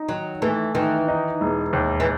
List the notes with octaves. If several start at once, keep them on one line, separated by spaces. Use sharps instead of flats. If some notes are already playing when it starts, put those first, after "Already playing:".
Already playing: D#4
D#3 F#3
E3 A3
D#3 E3
D#4
E1
D#2
E3